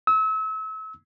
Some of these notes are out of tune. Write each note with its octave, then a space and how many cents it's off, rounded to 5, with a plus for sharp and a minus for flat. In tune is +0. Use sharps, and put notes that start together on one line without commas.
E6 -35